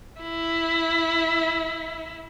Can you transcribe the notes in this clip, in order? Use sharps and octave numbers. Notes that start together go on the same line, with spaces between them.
E4